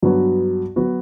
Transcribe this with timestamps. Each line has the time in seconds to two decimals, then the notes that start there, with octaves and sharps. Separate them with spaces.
0.03 G2 F#3 B3 F#4
0.76 F#3 B3 F#4